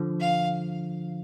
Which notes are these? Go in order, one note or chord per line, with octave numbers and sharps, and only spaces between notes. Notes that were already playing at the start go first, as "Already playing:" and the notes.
Already playing: D3 F3
F5